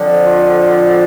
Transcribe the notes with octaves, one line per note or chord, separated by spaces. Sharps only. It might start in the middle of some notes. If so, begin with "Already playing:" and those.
Already playing: F2 D3 F3
F4